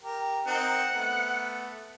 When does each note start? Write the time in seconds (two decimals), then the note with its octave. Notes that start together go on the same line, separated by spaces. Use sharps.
0.03 G4 A#4
0.47 C4 D#4 A#4 F#5
0.93 A3 B3